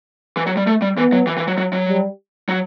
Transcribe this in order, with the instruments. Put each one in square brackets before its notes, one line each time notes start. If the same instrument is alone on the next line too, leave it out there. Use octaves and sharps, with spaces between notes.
[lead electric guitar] E3
F#3
G3
A3
G3
[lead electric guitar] E3 [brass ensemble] B3
[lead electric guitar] F#3
E3
E3
F#3
F#3
F#3
[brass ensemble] G3
[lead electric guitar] F#3